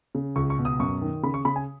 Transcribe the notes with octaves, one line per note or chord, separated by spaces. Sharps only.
C#3
C#2 C#6
C#6
B2
D#6
F#2 C#6
D#3
C#3 B5
C#6
C#3 B5
G#5